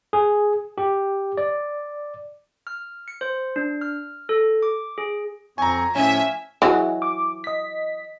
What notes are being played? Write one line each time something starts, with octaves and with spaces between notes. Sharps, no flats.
G#4
G4
D5
F6
C#7
C5
D4
F6
A4
D6
G#4
F2 C4 G#5 A#5 C#6
A2 F3 C#4 E5 G#5
E3 F#3 F#4 G#4 D#5
D6
D#5 B6